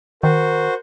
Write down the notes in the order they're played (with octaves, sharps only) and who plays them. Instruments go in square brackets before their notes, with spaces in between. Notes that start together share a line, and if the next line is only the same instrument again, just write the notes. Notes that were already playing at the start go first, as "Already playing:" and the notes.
[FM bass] D#3 [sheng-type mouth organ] F#4 C5 [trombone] A#4